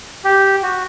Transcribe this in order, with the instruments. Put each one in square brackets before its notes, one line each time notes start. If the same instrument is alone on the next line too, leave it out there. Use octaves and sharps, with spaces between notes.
[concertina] G4
F#4